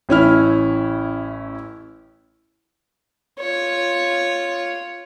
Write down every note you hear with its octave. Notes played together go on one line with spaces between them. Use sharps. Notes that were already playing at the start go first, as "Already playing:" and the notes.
A1 C#4 E4 F6
F4 C#5